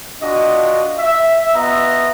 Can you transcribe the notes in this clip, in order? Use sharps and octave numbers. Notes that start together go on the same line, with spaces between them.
D4 F4 F#4 D#5
E5
B3 F4 B4 D#5 E5 A#5